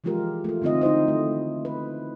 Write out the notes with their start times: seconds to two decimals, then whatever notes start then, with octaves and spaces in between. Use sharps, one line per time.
0.04 E3 F3 G#3 F4 G4 A#4
0.44 A3 F4
0.62 D3 D#3 C4 F4 D#5
0.81 D#4 E4 C5 D#5
1.08 A3
1.65 B4